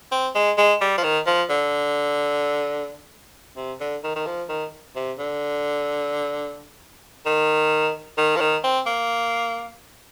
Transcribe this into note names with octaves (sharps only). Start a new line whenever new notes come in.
C4
G#3
G#3
G3
F3
D#3
F3
D3
C3
D3
D#3
D#3
F3
D#3
C3
D3
D#3
D#3
F3
D#3
C4
A#3